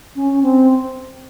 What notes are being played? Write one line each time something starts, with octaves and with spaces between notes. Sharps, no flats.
C#4
C4